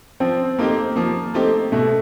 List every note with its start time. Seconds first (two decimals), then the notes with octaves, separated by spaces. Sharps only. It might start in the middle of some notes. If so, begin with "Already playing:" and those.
0.20 F3 C4
0.59 A3 A#3 C4 D#4 G4
0.96 F3 A#3
1.34 A3 C4 D#4 G4
1.72 B2 A3